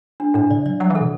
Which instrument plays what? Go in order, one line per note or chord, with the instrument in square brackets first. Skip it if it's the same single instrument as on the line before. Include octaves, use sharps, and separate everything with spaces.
[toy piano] D4
[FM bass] A2 [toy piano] D4
[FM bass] C#3 [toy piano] D5
[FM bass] F#3 [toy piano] D5
[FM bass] F#3 [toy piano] F#5
[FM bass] E3
[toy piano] A4
[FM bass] B2